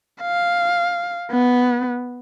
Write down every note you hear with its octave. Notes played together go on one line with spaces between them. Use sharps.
F5
B3